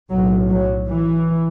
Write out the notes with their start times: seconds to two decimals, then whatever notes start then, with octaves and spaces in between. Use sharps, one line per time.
0.10 B1 A2 F#3
0.50 F#3
0.89 E3